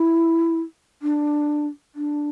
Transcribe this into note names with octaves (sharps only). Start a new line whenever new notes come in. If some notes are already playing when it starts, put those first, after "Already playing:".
Already playing: E4
D4
D4